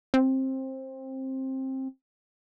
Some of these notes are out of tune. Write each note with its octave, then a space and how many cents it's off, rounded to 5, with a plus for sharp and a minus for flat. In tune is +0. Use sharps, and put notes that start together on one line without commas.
C4 +20